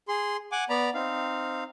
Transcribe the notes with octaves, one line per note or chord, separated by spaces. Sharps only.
G#4 C6
F#5 G#5 D6
B3 D5 A#5 B5
C4 D#4 F5